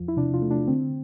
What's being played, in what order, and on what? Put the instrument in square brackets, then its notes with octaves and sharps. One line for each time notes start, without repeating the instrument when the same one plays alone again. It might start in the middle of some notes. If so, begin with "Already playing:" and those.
Already playing: [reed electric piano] E2 F3 F4
[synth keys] E4
[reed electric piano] C3 [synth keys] D4
[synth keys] F4
[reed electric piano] A3
[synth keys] D4
[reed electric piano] D3 [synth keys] C4